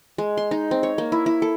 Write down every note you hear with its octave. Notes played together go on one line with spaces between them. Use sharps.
G#3
C6
D#4
C4
C#5
A#3
E4
E4
A4